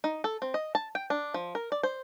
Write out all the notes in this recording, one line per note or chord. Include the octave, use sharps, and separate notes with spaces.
D#4
A4
C4
D#5
A5
G5
D4
F3
A#4
D5
C5